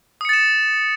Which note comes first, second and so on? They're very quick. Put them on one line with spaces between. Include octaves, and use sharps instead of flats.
D#6 C#7 A6 E7